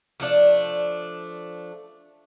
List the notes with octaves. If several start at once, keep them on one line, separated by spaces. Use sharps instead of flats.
F3 A3 D4